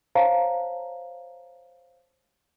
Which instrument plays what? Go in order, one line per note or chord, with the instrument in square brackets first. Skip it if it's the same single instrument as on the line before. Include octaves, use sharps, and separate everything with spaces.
[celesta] C5 C#5 F5 A5 A#5